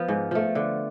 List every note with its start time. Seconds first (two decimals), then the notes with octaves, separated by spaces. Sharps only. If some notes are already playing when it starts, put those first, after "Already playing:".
Already playing: F3 B3
0.08 G#2
0.31 F3 A3
0.55 D3